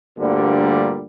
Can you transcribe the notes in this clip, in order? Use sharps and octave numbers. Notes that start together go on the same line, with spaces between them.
D2 G2 A#2 D3 G3 A#3